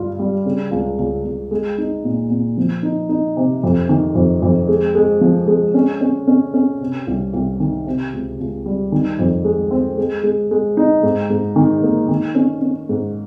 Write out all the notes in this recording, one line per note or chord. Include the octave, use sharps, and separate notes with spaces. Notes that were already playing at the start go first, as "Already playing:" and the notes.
Already playing: G2 F4
G3
C#3
C#2
C#2
C#2
G#3
D#4
A#2
A#2
F3
D#4
D#4
C3
F2
D#3
F2
F2
G#3
G#3
F3
G#3
C#4
C#4
C#4
C#4
C3
C2
C2
D#3
C3
C#2
C#2
G3
D#3
F2
G#3
C4
G#3
G#3
G#3
D#4
G#2
G#2
D#3
A#3
D#3
C#4
C#4
G#2